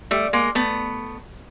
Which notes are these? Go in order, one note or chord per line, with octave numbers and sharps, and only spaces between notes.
G3 A3
G#3 A#3
A3 B3